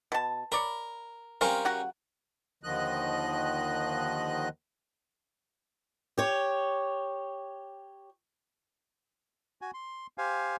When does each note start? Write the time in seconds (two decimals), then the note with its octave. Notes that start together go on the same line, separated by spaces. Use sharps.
0.12 B2 A5
0.52 A#4 C#5 D5 B5
1.41 G3 C4 C#4 A#4 C5 F5
1.65 C#3 F#4 F#5
2.63 D#2 D3 D#3 F3 D#5 F#6
6.18 G4 C#5
9.61 F#4 G#5
9.74 C6
10.18 G4 C5 F5 G#5